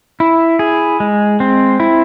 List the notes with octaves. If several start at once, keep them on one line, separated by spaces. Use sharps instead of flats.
E4
G#4
G#3
C4
E4